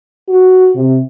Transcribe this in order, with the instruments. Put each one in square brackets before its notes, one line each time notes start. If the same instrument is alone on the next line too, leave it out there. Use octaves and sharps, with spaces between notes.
[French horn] F#4
C3